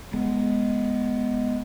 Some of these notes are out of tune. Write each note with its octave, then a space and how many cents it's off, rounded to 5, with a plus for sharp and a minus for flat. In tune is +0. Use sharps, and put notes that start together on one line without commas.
G#3 +0 B3 +0